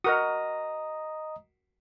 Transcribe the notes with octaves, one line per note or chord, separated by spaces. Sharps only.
F#4 A#4 D#5 A#5 D#6